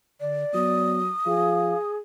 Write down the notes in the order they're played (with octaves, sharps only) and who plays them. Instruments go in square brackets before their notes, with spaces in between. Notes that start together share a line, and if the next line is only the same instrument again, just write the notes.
[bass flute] D3 [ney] D5
[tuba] F#3 [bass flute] B3 [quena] D#6
[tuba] F3 [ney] G#4 [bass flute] F5